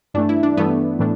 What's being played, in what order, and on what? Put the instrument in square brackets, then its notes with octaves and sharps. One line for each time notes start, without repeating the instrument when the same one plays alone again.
[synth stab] G2 E3 A3 [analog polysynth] D4
[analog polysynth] E4
D4
[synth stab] G2 E3 A3 [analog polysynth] B3
[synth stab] A2 E3 A3 D4